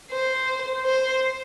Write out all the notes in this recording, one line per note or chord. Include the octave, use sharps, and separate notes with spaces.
C5
C5